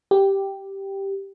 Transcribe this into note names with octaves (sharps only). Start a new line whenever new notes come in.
G4